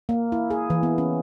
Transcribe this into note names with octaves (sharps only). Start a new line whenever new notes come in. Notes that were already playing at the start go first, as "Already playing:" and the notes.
A#3
E4
G#4
E3
B3
C#4